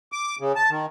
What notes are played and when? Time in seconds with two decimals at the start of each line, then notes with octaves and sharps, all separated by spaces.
0.12 D6
0.40 C#3
0.56 A5
0.70 D#3